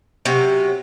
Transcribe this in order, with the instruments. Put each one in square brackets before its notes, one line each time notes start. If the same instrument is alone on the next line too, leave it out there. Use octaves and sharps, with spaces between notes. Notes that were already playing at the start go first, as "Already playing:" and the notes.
[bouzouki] C3 F#3 C#4